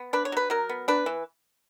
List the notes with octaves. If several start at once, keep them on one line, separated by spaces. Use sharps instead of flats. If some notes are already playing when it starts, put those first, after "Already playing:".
Already playing: B3
D4 B4
C#5
F#3 B4
F#3 A#4
B3
D4 B4
E3